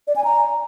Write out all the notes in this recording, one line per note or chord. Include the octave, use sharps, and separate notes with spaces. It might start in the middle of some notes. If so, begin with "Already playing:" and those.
D5
G#5
A#5